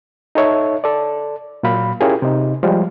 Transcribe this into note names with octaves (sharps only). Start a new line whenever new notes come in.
D#4 A4 C#5 E5
A4 D5
A#2 F#3 F5 B5
C#4 E4 F4 G4 G#4 A#4
C3 D#4
F3 G3 G#3